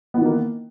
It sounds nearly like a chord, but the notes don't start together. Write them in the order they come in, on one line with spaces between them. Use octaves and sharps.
B3 E3 D#3 A#3